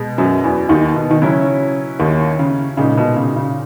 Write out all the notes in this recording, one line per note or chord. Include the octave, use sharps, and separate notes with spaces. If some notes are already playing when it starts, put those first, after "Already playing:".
Already playing: B2 G#3 B3
F#2 F#3
E2 E3
D#2 D#3
B2
D#3
C#3 F#3 C#4 E4
D#2 D#3
C#3
A#2 C#3 G#3 D#4
B2
C#3
C#3